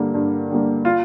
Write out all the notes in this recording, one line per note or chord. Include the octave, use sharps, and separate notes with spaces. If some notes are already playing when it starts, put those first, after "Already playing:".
Already playing: G2 D3 G3 A#3
G2
D3 G3 A#3
F4